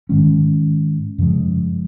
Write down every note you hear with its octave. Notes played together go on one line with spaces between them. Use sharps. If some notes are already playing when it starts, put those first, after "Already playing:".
G#2 D#3 G#3 C#4
F#2 C#3 F3 G#3